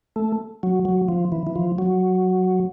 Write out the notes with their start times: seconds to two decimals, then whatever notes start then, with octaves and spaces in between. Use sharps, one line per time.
0.16 A3
0.63 F#3
0.85 F#3
1.08 F3
1.32 E3
1.47 E3
1.56 F3
1.78 F#3